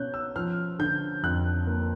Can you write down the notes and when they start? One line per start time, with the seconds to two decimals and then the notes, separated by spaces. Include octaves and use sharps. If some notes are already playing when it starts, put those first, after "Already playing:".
Already playing: B2 C#4 F#6 G6
0.14 E6
0.36 F3 F6
0.79 D3 G6
1.23 F2 F#6
1.67 A#3